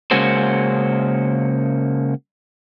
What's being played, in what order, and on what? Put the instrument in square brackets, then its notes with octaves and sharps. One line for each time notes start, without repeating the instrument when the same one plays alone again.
[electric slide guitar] C#3 G#3 A#3 C#4 F#4 C5